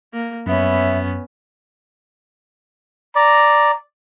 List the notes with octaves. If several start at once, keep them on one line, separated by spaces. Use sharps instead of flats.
A#3
F#2 B3 C#4 C#5 E5 B5
D5 A#5